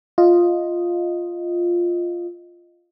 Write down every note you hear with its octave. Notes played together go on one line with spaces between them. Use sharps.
F4 D#5